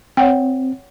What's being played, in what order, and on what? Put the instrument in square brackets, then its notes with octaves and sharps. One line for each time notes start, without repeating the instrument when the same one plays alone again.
[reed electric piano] C4 [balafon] C#5 F#5 G5